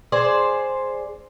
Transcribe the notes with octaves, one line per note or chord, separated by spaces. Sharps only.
G#4 C5 D5